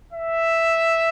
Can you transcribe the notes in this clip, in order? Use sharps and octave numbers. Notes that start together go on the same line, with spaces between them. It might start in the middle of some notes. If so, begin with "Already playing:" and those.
E5